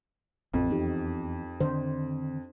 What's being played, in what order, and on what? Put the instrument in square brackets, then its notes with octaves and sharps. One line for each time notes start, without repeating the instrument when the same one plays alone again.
[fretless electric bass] A1 [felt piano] F2
[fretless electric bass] E2 [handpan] C4 D#4 G4
[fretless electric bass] D3 D#3 C4 [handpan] D4 C5